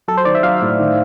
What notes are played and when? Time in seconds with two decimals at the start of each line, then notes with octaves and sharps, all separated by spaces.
0.08 F#3 A4
0.17 C5
0.25 D#3 D5
0.35 E5
0.43 F#3 F5
0.61 A2
0.79 D#3